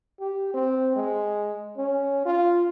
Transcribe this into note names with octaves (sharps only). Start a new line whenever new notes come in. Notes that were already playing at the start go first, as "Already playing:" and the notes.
G4
C4
G#3
C#4
F4